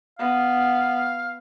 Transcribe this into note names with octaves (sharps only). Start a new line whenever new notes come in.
B3 F5